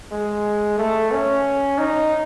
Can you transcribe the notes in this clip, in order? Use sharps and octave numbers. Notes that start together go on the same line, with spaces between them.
G#3
A3
C#4
D#4